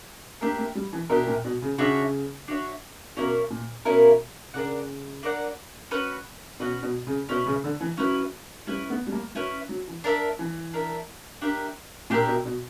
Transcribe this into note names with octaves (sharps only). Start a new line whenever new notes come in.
A#3 D4 G4 A#4 E5
A#3
G3
E3
B2 D4 G4 A#4 E5
A#2
B2
C#3
C#3 D4 F#4 C#5 E5
D4 F#4 C#5 E5
B2 A#3 C#4 E4 A#4
A#2
B2 A#3 C#4 E4 A#4
C#3 D4 A#4 D5 F#5
D4 A#4 D5 F#5
C#4 F#4 B4
B2 C#4 F#4 B4
B2
C#3
B2 C#4 E4 B4
C#3
D3
E3
F#3 C#4 E4 B4
G3 C#4 E4 B4
B3
G3
A#3
F#3 C#4 E4 B4
F#3
E3
D4 A#4 E5
E3
D4 A#4 E5
D4 G4 A#4 E5
A#2 D4 G4 A#4 E5
B2
B2